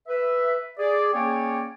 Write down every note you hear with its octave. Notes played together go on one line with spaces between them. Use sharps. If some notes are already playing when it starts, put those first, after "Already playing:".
B4 E5
G#4 D5
A#3 C#4 G#4 C#5 D5 G5